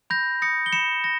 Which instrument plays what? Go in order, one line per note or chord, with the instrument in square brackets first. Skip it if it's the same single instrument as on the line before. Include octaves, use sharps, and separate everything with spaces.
[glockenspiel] B5 G6 A#6
D#6 G6 A#6 C#7
G7
B5 C#7 E7
A#6